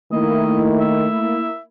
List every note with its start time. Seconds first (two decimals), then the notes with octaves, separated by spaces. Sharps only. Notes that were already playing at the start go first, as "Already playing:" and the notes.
0.12 D#3 A3 A#3 E4 D#5
0.80 E5